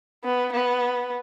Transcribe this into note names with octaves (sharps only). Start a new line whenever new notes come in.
B3
B3